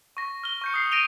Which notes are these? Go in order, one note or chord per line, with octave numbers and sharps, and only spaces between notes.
C#6 A#6
F6 G7
C#6 G6 C#7
D#6 C7
A#6 D7 D#7 F7 G7